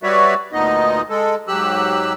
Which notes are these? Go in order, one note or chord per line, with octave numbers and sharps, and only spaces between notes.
G3 F#4 B4 C#5 D5 E5
D2 A#2 B3 D#4 D#5
G#3 A4
G#2 F#3 G4 E6 F#6